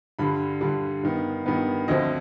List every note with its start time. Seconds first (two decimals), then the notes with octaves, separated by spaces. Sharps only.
0.19 G2 D3 G3 B5
0.61 G2 D3 G3
1.03 G2 D#3 B3
1.46 G2 D#3 B3
1.88 D2 D3 F3 C4 D#5